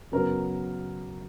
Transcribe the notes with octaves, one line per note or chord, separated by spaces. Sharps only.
F#2 C#3 F#3 B3 A#4